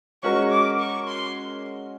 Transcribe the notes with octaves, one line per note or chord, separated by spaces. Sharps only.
G#3 C#4 F#4 A#4 C#6
D6
C#6
C6